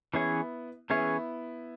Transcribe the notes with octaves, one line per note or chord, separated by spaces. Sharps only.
E3 B3 C#4 E4 G#4 C#5
E3 B3 C#4 E4 G#4 C#5